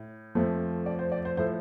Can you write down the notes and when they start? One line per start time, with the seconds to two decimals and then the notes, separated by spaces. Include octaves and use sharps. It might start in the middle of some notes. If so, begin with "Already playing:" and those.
Already playing: A2
0.35 F2 F3 A3
0.86 D5
0.99 C5
1.12 D5
1.25 C5
1.37 A2 F3 A3 C5